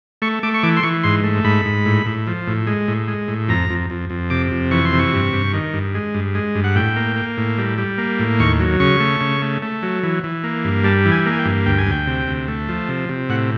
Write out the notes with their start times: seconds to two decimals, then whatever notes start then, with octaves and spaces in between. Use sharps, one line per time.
0.22 A3 C#6
0.43 A3 D6
0.54 C#6
0.63 E3 D6
0.77 C6
0.83 E3 C#6
1.03 G#2 C6
1.24 A3
1.44 G#2 B5
1.65 G#2
1.86 A2
2.06 A2
2.27 F3
2.47 A2
2.67 G#3
2.88 A2
3.08 G#3
3.28 A2
3.49 F2 A#5
3.70 F2
3.90 F2
4.10 F2
4.30 C3 D6
4.52 F2
4.71 E3 C#6
4.85 C6
4.93 C3
4.99 C#6
5.13 G2
5.33 G2
5.53 D#3
5.73 G2
5.95 G#3
6.14 G2
6.35 G#3
6.55 G2
6.64 F#5
6.75 A2 G5
6.96 A#3
7.16 A#3
7.38 A2
7.58 G3
7.78 G3
7.98 A#3
8.19 A2
8.40 D#2 C#6
8.60 F#3
8.80 C#3 C#6
9.00 A3
9.21 C#3
9.42 A3
9.63 A3
9.83 F#3
10.03 E3
10.24 E3
10.43 A#3
10.65 G2
10.84 G3 A5
11.05 E3
11.12 G#5
11.26 A#3
11.32 G#5
11.39 G5
11.45 G2
11.66 D2 G5
11.78 G#5
11.86 D2
11.91 G5
12.07 C3
12.27 D2
12.48 A3
12.68 F3
12.89 C3
13.09 C3
13.29 A2 F#5